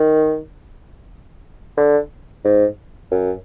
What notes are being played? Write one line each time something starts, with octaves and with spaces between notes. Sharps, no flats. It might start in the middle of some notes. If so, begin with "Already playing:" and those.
Already playing: D#3
D3
G#2
F#2